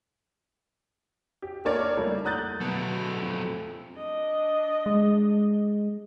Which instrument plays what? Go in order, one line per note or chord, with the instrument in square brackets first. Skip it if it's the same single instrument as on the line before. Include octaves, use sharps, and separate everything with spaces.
[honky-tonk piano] G4
A#3 D4 A#4 C#5 D5
G3 A3 A#3 E4
A#5 D#6 F#6 G6 A6
[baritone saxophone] B2 [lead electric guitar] F#3 A3
[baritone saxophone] F2
[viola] D4 D#5
[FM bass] G#3